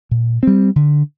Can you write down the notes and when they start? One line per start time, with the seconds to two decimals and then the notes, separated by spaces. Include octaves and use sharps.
0.11 A#2
0.43 G3 C4
0.76 D3